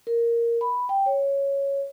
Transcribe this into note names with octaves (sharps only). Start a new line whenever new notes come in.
A#4
B5
G5
C#5